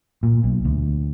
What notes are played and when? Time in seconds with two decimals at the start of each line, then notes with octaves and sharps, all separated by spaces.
0.23 A#2
0.44 B1
0.65 D2